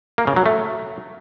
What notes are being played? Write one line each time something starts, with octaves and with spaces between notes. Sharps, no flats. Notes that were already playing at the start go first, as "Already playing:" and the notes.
A#3
C#3
F#3
A3